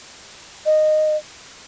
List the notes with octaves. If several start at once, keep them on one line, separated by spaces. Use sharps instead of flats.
D#5